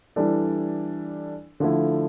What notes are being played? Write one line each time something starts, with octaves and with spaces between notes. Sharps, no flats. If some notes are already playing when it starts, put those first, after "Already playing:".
E3 G3 D4 A4 D5
D3 F3 A3 E4